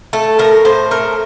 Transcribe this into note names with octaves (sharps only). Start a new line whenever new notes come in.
A3 A4
A2 A#4
A2 C5
A3 A#4